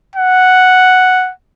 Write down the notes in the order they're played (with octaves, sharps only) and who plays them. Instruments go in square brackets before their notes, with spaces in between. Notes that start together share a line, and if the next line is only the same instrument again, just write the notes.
[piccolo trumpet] F#5